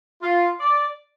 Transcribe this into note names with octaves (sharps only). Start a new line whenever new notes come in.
F4
D5